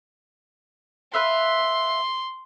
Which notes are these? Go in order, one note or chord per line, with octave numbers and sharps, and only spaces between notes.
B4 E5 F5 C6